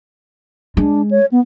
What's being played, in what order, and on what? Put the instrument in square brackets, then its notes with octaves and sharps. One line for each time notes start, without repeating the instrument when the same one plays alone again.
[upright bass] G#3 [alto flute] D4
[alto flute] C#5
B3